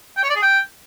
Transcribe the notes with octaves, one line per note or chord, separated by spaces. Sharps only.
G5
C#5
D5
G#4
G5